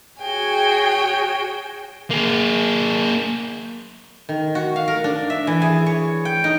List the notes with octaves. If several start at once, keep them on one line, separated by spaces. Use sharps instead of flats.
F#4 G#4 C#5 G5 G#5
A#3 G#4
D#3
F#4
F5
A#4
D4
E5
E3
G#4
C#5
G5
D#4